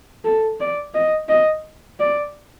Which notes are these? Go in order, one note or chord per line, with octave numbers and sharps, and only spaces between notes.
A4
D5
D#5
D#5
D5